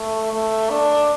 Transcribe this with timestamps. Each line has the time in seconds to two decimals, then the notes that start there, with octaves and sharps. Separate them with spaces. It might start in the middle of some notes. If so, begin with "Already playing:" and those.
Already playing: A3
0.33 A3
0.70 D4